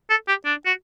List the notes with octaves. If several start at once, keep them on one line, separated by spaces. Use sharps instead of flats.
A4
G4
D4
F#4